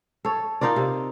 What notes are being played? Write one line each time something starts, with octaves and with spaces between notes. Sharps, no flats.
A4 C#5
D#4 F4 A#4 D5
C3